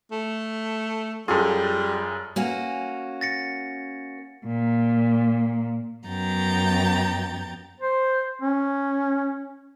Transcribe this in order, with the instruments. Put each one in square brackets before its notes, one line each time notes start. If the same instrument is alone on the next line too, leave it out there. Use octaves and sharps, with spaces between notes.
[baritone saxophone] A3
[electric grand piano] F#2 G#4 [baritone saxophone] G3 [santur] F4 A4
[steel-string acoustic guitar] A#3 C#4 F#4
[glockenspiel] A6 A#6 C#7
[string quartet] A#2
F#2 B3 G5 A#5 A6
[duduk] C5
C#4